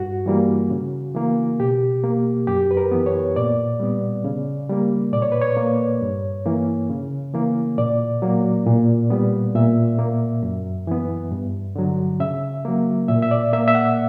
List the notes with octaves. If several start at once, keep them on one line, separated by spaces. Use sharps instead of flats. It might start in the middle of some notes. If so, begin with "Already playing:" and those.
Already playing: G2 F#4
E3 G3 A#3
C#3
E3 A#3
B2 G4
A#3
F#2 G4
B4
A#4
E3 B3
C#5
A#2 D5
G3 B3
C#3
G3 A#3
A#2 D5
C#5
B4
C#5
A#3
G2
E3 A#3
C#3
E3 A#3
A#2 D5
F#3 A#3
A#2
G3 B3
A#2 E5
A#3
F#2
E3 B3
G2
D3 F#3
C#3 E5
F#3 A#3
A#2 E5
E5
D5
A#3 E5
E5
F#5